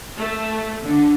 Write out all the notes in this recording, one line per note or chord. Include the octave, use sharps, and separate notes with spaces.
A3
D3